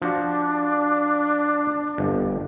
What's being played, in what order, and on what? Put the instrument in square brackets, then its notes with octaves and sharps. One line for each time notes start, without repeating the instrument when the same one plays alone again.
[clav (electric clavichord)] F3 F#4 [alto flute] D4
[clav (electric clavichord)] G1 F2